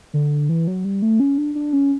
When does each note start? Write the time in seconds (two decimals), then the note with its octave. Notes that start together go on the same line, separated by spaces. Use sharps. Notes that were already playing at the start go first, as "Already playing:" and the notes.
0.14 D3
0.49 E3
0.67 F#3
0.85 G3
1.02 A3
1.20 C#4
1.38 D4
1.55 D4
1.73 C#4